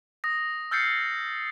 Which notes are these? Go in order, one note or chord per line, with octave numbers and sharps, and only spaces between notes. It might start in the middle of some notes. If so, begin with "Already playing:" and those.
D#6 A#6
E6 F6 G6 A6 C7 C#7